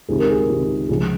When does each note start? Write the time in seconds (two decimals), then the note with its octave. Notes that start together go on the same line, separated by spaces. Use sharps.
0.09 C#2 C3 D#3 G#4
0.19 A#4
0.29 G#4
0.39 A#4
0.49 C#2 C3 D#3
0.89 C#2 C#3 F3 G#4